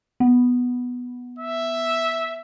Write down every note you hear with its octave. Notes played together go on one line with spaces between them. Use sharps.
B3
E5